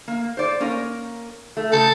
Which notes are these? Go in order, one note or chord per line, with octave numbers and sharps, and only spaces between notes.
A#3
C5 D5
A#3 C#4 A#4
A3
C#3 A4